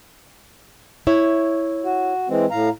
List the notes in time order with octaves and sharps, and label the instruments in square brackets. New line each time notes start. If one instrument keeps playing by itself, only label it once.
[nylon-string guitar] E4 C#5
[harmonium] F#4
E3 G#3 C4
A2 F5 A#5